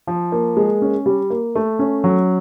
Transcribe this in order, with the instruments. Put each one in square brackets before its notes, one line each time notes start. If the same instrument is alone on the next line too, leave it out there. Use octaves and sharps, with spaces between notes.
[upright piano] F3
A#3
G#3
C#4
G3
A#3
A3
C#4
F#3